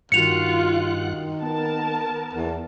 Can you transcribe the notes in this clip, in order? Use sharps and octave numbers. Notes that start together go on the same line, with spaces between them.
G2 D#3 F4 F#4 F#5 F#6 C#7 F7
B3 A#4 A5
E2